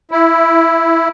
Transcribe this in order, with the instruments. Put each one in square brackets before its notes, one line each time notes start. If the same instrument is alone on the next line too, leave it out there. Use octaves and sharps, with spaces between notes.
[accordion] E4